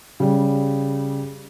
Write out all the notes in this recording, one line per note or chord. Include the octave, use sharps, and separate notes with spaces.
C#3 G3